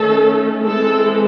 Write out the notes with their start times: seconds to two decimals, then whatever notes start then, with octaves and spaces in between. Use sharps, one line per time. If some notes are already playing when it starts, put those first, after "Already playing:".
Already playing: D#3 A3 C#4 A4
0.67 E3 G#3 C4 A4